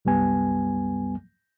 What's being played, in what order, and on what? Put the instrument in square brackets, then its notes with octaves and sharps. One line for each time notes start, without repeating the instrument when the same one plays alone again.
[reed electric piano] C2 F#2 G3 B3 G#5